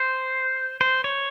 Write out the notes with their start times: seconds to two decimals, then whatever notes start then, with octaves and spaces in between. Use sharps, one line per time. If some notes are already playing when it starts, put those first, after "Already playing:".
Already playing: C5
0.81 C5
1.04 C#5